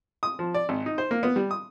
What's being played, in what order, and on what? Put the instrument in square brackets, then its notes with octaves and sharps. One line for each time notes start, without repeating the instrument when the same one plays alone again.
[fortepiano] D#6
F3
D5
G#1
D#4
C5
A#3
B3
G3
D#6